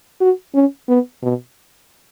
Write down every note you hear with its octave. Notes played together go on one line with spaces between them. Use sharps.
F#4
C#4
B3
B2